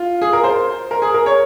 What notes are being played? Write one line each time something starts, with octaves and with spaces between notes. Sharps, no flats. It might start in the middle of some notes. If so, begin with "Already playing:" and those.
Already playing: F4
G#4
A#4
C5
A#4
G#4
A#4
C#5